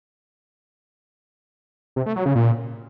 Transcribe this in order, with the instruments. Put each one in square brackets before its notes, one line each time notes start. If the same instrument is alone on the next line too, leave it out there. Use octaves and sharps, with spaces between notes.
[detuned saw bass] C3
A3
F#3
C#3
A#2